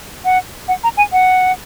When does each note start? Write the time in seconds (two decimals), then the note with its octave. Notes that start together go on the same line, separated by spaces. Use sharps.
0.25 F#5
0.68 F#5
0.84 A#5
0.97 G#5
1.12 F#5